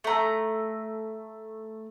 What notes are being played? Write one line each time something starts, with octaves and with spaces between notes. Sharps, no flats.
A3 A#5